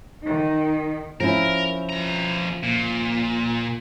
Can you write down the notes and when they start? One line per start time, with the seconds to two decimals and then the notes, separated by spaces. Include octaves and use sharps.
0.24 D#3 D#4
1.20 F3 C#4 E4 A#4
1.90 F2 A#5
2.63 A#2